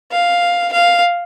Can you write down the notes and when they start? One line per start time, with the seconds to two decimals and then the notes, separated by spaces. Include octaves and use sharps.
0.11 F5
0.73 F5